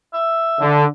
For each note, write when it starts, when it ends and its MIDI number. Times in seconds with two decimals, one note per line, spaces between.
0.13 0.73 76
0.61 0.86 50